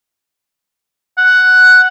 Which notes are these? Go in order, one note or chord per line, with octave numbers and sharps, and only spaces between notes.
F#5